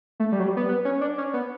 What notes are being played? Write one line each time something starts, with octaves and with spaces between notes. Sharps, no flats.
A3
G3
F#3
G3
B3
B3
C#4
D4
C#4
B3